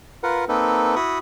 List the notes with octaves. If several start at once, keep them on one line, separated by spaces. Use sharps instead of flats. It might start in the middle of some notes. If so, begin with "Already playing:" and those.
F4 A#4 B4 F#5
A#3 C4 D#4 A4 B4
E4 F#4 B5 C#6 D#6